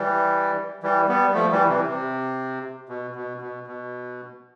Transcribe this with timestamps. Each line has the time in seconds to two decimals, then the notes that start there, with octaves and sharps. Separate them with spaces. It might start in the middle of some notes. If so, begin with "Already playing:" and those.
Already playing: E3 G3
0.83 E3 G3
1.08 G3 B3
1.34 F3 A3
1.52 E3 G3
1.68 C3 E3
1.87 C3
2.89 B2
3.15 B2
3.41 B2
3.67 B2